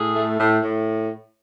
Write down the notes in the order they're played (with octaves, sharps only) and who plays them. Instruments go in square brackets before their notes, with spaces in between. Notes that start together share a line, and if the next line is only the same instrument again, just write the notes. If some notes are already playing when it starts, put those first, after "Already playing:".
Already playing: [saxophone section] A2 G#4
A3
A2
A2